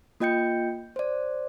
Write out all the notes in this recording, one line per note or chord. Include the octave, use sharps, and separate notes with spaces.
A#3 F4 D#5 G5 G6 C#7
C5 D5